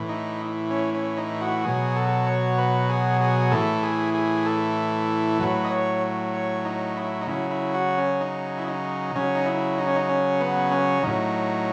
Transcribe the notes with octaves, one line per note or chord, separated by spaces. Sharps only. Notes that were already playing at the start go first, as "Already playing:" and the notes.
Already playing: A2 E3
D#4
C#4
C#4
D#4
F#4
B2 F#3 G#4
A4
C#5
B4
G#4
G#4
A2 E3 A4
G#4
G#4
A4
A2 F#3 B4
D#5
C#5
C#5
D#4
E4
D#4
C#3 F#3 E4
E4
F#4
C#4
D#4
E4
D#4
C#3 F#3 C#4
D#4
E4
D#4
C#4
D#4
C#4
B3
C#4
A2 F#3 D#4